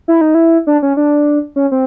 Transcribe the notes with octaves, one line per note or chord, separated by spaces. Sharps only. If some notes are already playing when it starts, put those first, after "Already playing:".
E4
D#4
E4
D4
C#4
D4
C#4
C4